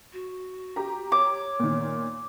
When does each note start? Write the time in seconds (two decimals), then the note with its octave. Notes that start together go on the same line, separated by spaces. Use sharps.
0.13 F#4
0.76 G4 A#5
1.12 C#5 D6
1.59 A#2 D#3